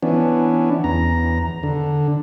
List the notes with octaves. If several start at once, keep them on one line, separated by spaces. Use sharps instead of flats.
E3 B3 C#4 D4
E2 A#5
D3